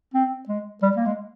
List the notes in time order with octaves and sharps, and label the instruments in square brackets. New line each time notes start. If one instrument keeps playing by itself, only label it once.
[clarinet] C4
G#3
G3
A#3
G#3